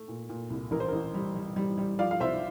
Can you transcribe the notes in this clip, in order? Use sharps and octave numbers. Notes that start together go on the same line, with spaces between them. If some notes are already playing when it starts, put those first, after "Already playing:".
Already playing: A3
A#2
A#2
C2
A1 A#4
C5
A1 A#4
G3
G3
G3
G3
F3 D5 F5
F5
C2 C5 E5